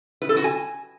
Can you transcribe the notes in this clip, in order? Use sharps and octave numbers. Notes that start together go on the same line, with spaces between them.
B4
A4
F#4
G#5